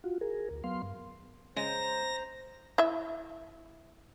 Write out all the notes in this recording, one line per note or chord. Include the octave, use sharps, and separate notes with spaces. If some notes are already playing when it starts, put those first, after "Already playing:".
F4 F#4
G#4 A#4
D2
F#3 B3 F5 C6
G2
C#3 G#3 C5 A#5 A#6
E4 E5